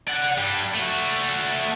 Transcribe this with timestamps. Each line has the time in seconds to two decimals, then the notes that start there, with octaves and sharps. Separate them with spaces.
0.08 D5 F#5
0.38 G2 G3
0.74 A3 F#4